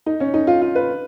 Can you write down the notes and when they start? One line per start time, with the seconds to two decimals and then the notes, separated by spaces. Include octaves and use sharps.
0.06 D#4
0.20 C#4
0.34 D#4
0.47 F4
0.61 F4
0.75 B4